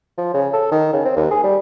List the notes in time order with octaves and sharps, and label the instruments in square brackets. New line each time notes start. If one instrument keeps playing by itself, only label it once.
[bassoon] F3
C#3
A4
D#3
C#3
C4
D#2
G#4
G3